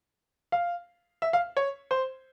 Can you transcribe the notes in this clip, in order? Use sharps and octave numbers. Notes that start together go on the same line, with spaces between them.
F5
E5
F5
C#5
C5